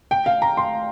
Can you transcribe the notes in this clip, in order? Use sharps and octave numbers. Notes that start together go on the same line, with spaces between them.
G5
F5
A#5
C6